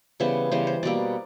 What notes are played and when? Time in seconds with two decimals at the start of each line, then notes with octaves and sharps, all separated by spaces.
0.20 C#3 E3 G3 B3 C5
0.51 C#3 E3 G3 B3 C5
0.67 C5
0.83 B2 G3 A#3 D5